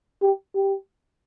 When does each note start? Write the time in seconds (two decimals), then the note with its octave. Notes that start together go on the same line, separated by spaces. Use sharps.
0.22 G4
0.55 G4